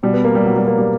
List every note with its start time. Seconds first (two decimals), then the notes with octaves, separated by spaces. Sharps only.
0.03 B2 G3
0.14 B3
0.24 A#3
0.35 G3
0.46 B2 F#3
0.56 G3
0.67 A#3
0.78 G3